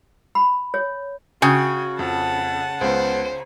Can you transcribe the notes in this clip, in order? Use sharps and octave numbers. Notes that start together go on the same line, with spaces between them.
B5
C#5
C#3 F#4 G5 G#5 D#6
F2 F#5 A5
C#2 B3 C5